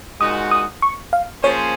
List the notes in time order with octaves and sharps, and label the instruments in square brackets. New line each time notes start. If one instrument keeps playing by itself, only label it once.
[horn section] A#2 G#3 D#4 F#4 [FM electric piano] D#6
[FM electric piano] D#6
C#6
F5
[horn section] F3 A#3 C#4 G#4 C5 [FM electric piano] C#5